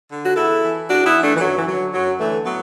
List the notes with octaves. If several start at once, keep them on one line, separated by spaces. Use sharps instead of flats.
D3
F#4
E2 E4 A4
E3
E2 D4 F#4
B3 E4
E3
A3 D4
E3
F#2 F#3
E3
D3 F#3
F#2 F#3
D3 E3 A3
A2 F#3 B3